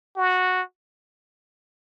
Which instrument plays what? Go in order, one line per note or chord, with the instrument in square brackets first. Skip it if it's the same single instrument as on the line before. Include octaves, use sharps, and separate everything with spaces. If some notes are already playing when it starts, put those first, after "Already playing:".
[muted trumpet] F#4